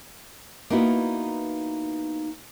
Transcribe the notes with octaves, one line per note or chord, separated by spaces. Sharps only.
A#3 B3 D#4 E4 F#4